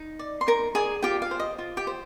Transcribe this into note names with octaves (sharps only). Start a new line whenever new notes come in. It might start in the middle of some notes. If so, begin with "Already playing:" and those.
Already playing: D#4
D5
C6
D#4 A#4 A#5
G#4 D5 G#5
F4 G4 G5
F5
C5
D#5
F4
G4 G5
C5